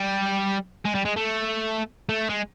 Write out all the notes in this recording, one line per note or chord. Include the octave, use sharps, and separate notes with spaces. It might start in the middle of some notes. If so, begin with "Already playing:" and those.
Already playing: G3
G#3
G3
G#3
A3
A3
G#3